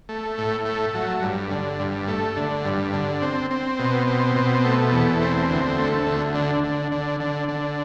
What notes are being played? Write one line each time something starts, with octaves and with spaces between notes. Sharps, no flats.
A3
A2
A3
F#3
G2
D3
G2
A3
D3
G2
D3
C4
C4
B2
C4
B2
A3
E2
C4
D2
A3
D2
D3
D3
D3
D3
D3